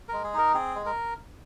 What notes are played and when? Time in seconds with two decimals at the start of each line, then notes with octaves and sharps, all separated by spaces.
0.09 G#3 A#4
0.24 G#4
0.34 D#4 A#4
0.54 C4 G#4
0.76 G#3
0.86 A#4